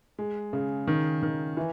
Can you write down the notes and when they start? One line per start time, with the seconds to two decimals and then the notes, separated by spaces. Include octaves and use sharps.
0.19 G#3
0.53 C#3
0.87 D#3
1.23 D#3
1.57 E3